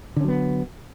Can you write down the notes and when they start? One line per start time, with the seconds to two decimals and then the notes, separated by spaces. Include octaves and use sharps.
0.16 D3
0.20 C#4
0.24 F#3
0.28 B3